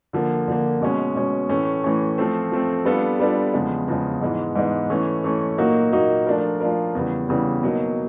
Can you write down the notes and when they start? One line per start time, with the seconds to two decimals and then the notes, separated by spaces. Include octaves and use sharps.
0.13 D3 F3 A#3
0.48 D3 F3 A#3
0.81 B2 G#3 C#4
1.16 B2 G#3 C#4
1.49 A2 E3 A3 C#4
1.84 A2 E3 A3 C#4
2.18 F3 A3 C4
2.52 F3 A3 C4
2.85 G3 B3 D4 F4 A4
3.20 G3 B3 D4 F4 A4
3.53 E2 C#3 F3 G#3
3.88 E2 C#3 F3 G#3
4.21 G#2 E3 G#3 B3
4.55 G#2 E3 G#3 B3
4.90 E3 A3 C#4
5.24 E3 A3 C#4
5.58 A#2 F#3 A#3 D#4 F#4
5.92 A#2 F#3 A#3 D#4 F#4
6.26 F3 A3 D4 F4 A#4
6.60 F3 A3 D4 F4 A#4
6.95 E2 C#3 E3 G3
7.28 E2 C#3 E3 G3
7.63 B2 F#3 A#3 D#4